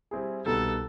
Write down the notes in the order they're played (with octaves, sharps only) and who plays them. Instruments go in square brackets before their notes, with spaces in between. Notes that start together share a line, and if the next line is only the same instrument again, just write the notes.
[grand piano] G3 C4 E4 G#4
[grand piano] C2 B2 G3 B3 D#4 [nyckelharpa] A4